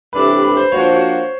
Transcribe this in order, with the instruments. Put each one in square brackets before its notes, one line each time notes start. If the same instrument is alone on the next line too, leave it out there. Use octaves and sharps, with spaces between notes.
[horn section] C3 E3 A3 D4 G4 [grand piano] B4
[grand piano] B4
C5
[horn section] F3 A#3 D4 F#4 [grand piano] C#5
[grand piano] C5
C#5